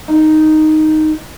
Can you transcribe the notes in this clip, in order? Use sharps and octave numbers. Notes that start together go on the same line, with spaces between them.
D#4